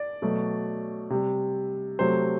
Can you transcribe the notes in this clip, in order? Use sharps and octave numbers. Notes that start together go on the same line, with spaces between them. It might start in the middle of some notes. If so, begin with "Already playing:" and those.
Already playing: D5
B2 F#3 A3
C3 G3
C3 F#3 A3 C5